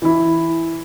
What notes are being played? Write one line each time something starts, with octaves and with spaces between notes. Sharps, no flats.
E3 E4